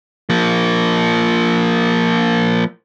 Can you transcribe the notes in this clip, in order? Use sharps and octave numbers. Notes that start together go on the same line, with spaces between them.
F3 A#3